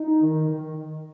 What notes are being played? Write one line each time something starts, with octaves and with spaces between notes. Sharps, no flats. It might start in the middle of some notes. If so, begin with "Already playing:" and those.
Already playing: D#4
D#3
D#3